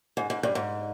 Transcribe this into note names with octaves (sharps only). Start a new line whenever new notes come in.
G#2
G#2
G2
G#2